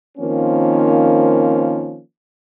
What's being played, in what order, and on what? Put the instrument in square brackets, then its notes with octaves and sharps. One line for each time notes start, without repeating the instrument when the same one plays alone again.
[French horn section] D#3 F3 A#3 C4 C#4